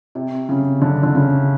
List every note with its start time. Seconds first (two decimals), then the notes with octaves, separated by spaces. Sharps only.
0.15 C3
0.49 C#3
0.81 D3
1.03 D3
1.15 C#3